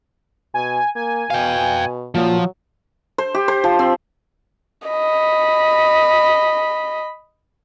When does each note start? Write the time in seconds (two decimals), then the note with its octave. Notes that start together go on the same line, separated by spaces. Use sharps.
0.54 B2 G#5
0.95 A#3 G#5
1.30 B2 F5 G5
2.15 A#2 F3 F#3
3.18 C5
3.35 G4
3.48 C5
3.64 F3
3.79 C4
4.88 D#5 B5